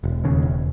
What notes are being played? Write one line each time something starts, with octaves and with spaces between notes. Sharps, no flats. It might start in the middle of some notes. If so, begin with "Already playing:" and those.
E1
D#2 C#3
E1